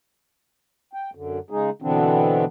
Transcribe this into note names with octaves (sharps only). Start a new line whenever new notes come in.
G5
F#2 D3
C#3 G#3 D#4 G#4
B2 D3 E3 B3 C4 D4